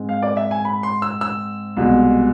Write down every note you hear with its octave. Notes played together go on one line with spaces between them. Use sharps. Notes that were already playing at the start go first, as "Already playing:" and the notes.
Already playing: G#2 G#3 C4
F5
D5
E5
G#5
B5
C6
E6
E6
C2 B2 G#3